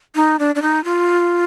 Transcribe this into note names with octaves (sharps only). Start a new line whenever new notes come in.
D#4
D4
D4
D#4
F4